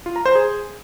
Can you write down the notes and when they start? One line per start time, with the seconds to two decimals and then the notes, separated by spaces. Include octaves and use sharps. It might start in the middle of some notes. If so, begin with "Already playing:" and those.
0.06 F4
0.16 A#5
0.26 C5
0.35 G#4